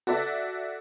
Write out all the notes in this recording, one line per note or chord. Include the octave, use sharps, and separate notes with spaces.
F#4 A4 D5 E5